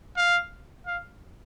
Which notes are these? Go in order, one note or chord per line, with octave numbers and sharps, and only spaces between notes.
F5
F5